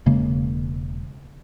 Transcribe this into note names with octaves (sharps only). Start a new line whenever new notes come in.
E1 C#3 G#3 A#3